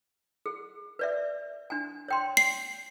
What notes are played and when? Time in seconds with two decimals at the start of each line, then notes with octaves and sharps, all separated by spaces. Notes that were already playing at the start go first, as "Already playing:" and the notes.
0.46 G#4
0.99 B4 D5 E5
1.70 D4 G#5
2.08 C#5 G5 C6
2.37 C7